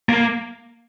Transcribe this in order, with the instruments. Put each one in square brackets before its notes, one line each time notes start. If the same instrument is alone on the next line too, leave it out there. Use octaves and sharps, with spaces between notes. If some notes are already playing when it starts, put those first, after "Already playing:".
[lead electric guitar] A#3